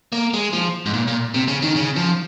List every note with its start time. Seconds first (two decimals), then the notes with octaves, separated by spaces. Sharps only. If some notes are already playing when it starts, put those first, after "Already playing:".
0.12 A#3
0.34 G#3
0.53 F3
0.86 G#2
0.94 A#2
1.07 A#2
1.34 C3
1.48 C#3
1.63 D#3
1.76 C#3
1.96 F3